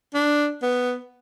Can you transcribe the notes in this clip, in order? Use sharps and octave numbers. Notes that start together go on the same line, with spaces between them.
D4
B3